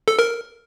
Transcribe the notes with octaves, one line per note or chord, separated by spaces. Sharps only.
A4
A#4